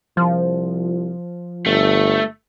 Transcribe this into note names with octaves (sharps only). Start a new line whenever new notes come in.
C2 F3
G1 A3